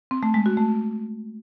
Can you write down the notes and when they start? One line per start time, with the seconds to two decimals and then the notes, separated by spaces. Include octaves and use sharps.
0.11 C4
0.23 A3
0.34 G#3
0.46 F#4
0.57 A3